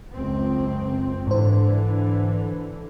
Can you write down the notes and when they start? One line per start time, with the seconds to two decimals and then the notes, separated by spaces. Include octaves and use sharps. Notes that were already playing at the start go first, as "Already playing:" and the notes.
0.13 C#2 F#2 C4
1.27 G#2 D3 E3 C5